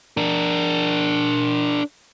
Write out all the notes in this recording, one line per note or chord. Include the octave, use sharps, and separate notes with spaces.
D4 A#4